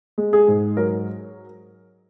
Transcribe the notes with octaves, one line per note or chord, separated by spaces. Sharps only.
G#3
G#4
G#2
F#3 A#4